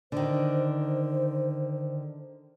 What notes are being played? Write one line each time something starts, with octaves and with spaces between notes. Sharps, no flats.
D3 D#3 C5